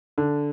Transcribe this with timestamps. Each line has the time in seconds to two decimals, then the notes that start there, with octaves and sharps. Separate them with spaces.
0.18 D3